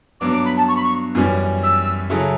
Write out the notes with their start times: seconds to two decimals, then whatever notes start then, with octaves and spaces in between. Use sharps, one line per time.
0.20 G2 F#3 B3 D4 D6
0.32 D6
0.44 B5
0.57 A5
0.68 C#6
0.76 B5
0.83 C#6
1.15 F#2 E3 G3 C#4
1.63 E6
2.10 C#3 F#3 C#4 E4 A4